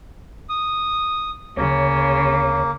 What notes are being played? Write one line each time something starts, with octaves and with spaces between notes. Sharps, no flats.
D#6
D2 C#3 A#3 C#5